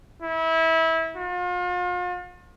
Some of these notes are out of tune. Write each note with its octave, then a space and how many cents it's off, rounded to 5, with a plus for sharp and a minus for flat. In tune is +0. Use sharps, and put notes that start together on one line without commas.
E4 -25
F4 +40